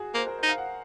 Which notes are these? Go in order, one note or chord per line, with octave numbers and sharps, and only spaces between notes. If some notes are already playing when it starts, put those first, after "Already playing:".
Already playing: F#4 G#4
A#3 C5
A#4
D#4 C5
F5
F#5